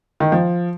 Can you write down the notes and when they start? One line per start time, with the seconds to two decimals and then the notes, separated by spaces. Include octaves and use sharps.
0.20 D#3
0.32 F3